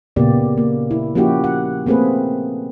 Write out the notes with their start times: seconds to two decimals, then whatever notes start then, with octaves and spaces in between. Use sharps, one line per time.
0.16 A#2 C#3 A#3 B3 G4 D5
0.58 A#3
0.91 E4
1.15 F3 A#3 C#4 E4 F#4 G4
1.44 F#5
1.86 A3 A#3 C4 G#4 B4